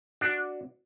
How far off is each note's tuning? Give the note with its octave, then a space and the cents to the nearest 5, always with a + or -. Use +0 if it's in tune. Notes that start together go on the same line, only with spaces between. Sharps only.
D4 +0 F#4 +0